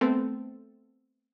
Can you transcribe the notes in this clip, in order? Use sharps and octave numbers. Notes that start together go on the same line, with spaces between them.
A3 B3 C4 A4